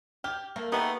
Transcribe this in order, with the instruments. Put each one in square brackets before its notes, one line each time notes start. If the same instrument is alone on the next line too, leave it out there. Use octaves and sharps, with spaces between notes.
[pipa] G4 [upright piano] F6 G6
[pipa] A3 [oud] A#3
[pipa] A3 D#4 [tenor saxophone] B3 [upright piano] G4